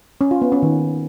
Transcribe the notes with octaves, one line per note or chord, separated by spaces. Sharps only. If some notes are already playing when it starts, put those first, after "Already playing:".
C#4
F4
B3
C#4
D#3